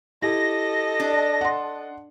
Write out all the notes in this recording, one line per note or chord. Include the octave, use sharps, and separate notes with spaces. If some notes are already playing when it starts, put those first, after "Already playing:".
E4 G4 A4 D#5 A#6
D4
F#5 C6